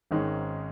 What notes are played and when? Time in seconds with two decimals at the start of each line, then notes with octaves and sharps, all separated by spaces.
0.11 G#1 G#2 D#3 G#3 C#4